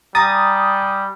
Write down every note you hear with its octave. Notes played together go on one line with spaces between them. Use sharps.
G3 G#5 A#5 D#6 A6